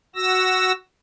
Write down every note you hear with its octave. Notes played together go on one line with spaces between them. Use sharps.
F#4 E6 A#6